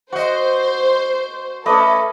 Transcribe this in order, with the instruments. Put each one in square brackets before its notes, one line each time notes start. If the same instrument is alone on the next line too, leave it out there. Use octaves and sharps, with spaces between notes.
[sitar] F#4 D#5 [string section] C5
[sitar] A3 C#4 [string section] A4 [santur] B4 D5 D#5